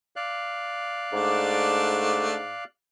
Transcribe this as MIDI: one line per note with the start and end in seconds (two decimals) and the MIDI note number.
0.16 2.64 74
0.16 2.64 77
0.16 2.64 90
1.13 2.56 44
1.13 2.35 57
1.13 2.35 62